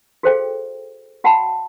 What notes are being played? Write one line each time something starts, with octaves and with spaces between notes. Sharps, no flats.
F#4 G#4 A4 C5 F5 G5
F#4 F#5 G5 A5 B5